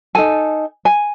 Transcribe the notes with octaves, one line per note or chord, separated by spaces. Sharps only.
D#4 A4 G#5
G#5